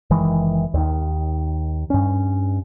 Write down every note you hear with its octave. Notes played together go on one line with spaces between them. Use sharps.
F#1 D#3 E3 G#3
D#2 D#3
G2 C#4